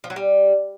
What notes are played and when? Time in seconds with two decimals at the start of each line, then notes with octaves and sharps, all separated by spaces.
0.04 F3
0.10 F#3
0.16 G3